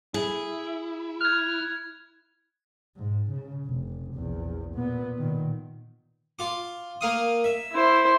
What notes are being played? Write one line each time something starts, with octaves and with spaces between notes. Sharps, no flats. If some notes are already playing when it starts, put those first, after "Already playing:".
E4 G#4
F6 F#6 G#6
G#2
C#3
F1
A#1 E2
A#2 B3
A#2 D#3
F4 D6
A#3 F5 D#6
E5
E4 C5